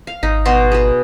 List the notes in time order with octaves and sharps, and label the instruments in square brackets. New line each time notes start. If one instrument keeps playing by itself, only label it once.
[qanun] F5
[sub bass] G#1 [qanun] D#4
[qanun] B2 F#4 C6
G#4 B4